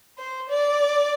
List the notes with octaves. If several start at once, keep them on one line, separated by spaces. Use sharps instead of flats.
C5
D5